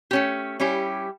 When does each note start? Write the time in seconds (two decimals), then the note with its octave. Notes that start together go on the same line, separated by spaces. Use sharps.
0.11 A3 C#4 G4
0.60 G3 C#4 E4 G4